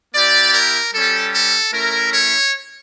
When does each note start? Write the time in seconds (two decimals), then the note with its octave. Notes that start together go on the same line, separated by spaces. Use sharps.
0.15 A#3 E4 G4 D5
0.54 A#4
0.94 G3 C#4 G4 A4
1.34 A4
1.73 A3 C#4 E4 A#4
2.13 C#5